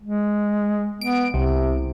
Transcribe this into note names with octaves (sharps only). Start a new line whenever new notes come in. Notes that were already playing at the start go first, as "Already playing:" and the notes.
G#3
B3 D7
C2 C3